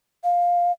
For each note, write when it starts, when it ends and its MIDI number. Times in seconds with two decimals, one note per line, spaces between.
0.24 0.72 77